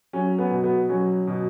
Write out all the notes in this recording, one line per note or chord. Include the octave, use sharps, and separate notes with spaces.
F#3 C#4
B3
B2
B3
F#3 C#4
B2